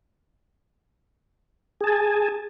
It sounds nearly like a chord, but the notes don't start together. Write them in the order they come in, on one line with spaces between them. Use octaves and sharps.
G#4 A5 G#5